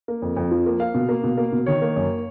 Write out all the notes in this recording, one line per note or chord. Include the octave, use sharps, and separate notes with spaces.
A#3
F2
F2
F3
A#3
A#3 F5
B2
A#3
B2
A#3
B2
D#3 C#5
A#3
F#2